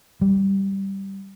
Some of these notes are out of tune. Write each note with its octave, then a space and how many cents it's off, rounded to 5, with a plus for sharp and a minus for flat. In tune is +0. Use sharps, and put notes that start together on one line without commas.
G3 -5